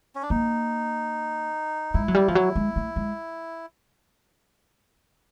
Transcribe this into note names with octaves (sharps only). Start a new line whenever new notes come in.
C#4
D4
A#3 D#4
G#3 E4
F#3
G3
F3
F#3
G#3
A3
G#3